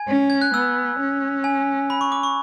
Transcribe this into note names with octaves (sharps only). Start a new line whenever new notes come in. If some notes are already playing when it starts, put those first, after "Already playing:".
Already playing: G#5 G#6
C#4
G#6
F#6
B3 E6
C#4
G#5
B5
C#6
D6
C#6